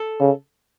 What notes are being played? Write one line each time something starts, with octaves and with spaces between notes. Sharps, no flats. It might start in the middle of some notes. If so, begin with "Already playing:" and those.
Already playing: A4
C#3